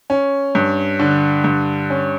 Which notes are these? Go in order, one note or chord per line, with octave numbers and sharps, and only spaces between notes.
C#4
G2
D3
G2
C#4